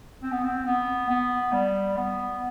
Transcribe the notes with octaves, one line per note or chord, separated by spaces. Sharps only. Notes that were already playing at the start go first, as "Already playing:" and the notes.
C4
B3
C4
B3
B3
G3
B3